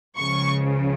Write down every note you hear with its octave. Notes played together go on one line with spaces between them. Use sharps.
C#2 C#3 F3 C#6